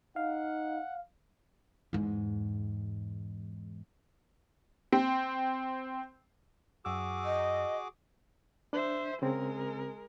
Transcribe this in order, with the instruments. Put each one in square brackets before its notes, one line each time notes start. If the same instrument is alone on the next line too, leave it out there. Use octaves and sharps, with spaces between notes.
[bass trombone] D#4 [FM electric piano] F5 [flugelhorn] F#5
[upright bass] E2 G#2
[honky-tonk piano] C4
[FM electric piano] F#2 E6 [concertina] F#4 G#4 D6
[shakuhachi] D#5
[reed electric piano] D4 [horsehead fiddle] C5 E5
[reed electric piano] C#3 C4 [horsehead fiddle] G#3 A#4